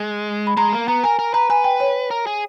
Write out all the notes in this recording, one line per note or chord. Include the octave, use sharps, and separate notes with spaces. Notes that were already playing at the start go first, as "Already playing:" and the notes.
Already playing: G#3
B5
G#3 A#5
A#3
B3 A#5
A#4 G#5
A#4
B4 A#5
B4 G#5
G5
C#5
A#4
G#4